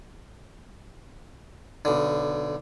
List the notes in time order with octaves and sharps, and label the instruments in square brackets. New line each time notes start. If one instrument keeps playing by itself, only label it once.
[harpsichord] B1 D3